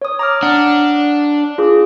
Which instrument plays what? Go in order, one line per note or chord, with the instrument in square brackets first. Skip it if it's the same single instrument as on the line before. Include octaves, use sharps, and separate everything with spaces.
[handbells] C#5 D#6
A#5 D6 F6
[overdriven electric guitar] D4 [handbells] F#5
[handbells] F4 G#4 D6